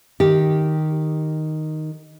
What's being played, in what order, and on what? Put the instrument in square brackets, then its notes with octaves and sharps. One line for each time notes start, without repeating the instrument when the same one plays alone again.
[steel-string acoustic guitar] D#3 [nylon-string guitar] G4